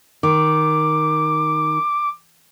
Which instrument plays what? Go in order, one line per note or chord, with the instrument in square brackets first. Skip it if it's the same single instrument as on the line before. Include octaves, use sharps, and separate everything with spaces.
[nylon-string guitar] D#3 [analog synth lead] D6